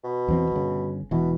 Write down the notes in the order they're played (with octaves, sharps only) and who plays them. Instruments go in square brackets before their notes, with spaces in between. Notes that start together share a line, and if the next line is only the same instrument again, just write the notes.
[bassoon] B2
[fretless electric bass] E2 C4
G1 C#3
[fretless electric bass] E1 E3 [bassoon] B2